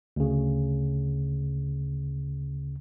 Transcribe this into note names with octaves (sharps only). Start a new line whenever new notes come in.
D2 C#3